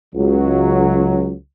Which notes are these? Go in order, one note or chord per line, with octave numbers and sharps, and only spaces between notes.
C#2 F#3